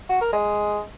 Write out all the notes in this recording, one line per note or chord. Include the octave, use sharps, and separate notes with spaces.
F#4
A#4
G#3